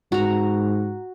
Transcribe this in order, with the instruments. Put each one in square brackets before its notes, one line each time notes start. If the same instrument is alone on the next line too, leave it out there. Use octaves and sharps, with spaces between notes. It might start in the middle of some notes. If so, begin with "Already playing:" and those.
[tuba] G#2 [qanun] F#4 A#5